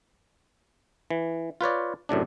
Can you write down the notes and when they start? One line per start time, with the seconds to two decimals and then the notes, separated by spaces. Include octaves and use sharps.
1.10 E3
1.61 F4 B4 C#5 D5
2.09 F#2 A2 C3 D4